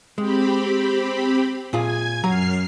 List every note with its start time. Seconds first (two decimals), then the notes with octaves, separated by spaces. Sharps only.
0.18 G#3 C4 G4 B5
1.73 A#2 F4 G#4 G#5 G#6
2.24 F#2 F#3 A#5 F6 C7